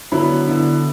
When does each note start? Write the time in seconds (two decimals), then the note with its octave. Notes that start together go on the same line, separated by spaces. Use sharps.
0.12 D3 F#3 B3 E4 B5
0.48 D3 B3 E4